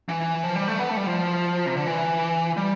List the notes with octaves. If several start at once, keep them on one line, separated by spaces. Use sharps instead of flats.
E3
F3
G3
A3
B3
A3
G3
F3
C3
D3
E3
G3